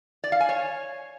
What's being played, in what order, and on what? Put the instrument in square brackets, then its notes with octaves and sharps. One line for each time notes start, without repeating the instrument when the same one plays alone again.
[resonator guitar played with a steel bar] D5
F5
G#5
C#5